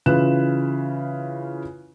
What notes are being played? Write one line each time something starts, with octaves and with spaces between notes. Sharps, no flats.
C#3 E3 F4 B4 F#6 E7